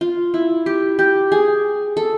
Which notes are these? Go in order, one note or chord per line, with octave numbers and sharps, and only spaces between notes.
F4
E4
G4
G4
G#4
A4